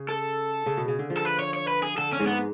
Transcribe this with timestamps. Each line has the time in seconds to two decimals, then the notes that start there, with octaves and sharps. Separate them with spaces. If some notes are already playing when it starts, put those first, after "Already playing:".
Already playing: C#3
0.09 A4
0.66 C#3
0.77 B2
0.88 C#3
0.99 D3
1.10 F3
1.17 A4
1.25 B4
1.39 C#5
1.54 C#5
1.68 B4
1.83 G#4
1.98 D3 A4
2.13 C#4
2.19 G#2 G#3
2.27 B3